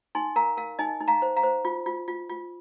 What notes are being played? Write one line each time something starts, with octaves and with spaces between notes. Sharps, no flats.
D#4 G#5 C6
A#4 F5 A#5
A#4 F5
D#4 D#5 G#5
D#4
F5 A#5
C5
F5 A#5
C5
F4
F4
F4
F4